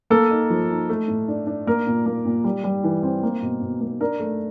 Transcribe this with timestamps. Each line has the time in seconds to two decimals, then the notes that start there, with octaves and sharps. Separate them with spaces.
0.10 A#3 A4
0.31 D#4
0.50 F3
0.70 D#4
0.89 A3
1.08 A2
1.28 D4
1.47 D4
1.67 A#3 A#4
1.87 A#2
2.06 A#3
2.25 A#2
2.44 G3
2.64 G3
2.84 E3
3.03 C4
3.23 A#3
3.43 B2
3.62 B2
3.81 A#3
4.00 D4 A#4
4.20 A3